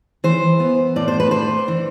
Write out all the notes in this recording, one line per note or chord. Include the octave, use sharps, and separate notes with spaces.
E3 C5
B3
A2 D5
C5
B4
D4 C5
E3